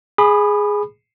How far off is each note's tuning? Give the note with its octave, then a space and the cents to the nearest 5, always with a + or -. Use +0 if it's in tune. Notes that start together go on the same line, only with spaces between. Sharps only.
G#4 +0 B5 +0 D#6 -40